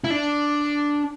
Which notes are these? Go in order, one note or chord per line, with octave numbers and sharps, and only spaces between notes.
E4
D4